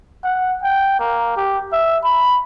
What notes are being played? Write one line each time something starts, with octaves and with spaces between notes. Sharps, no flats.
F#5
G5
A#3
G4
E5
B5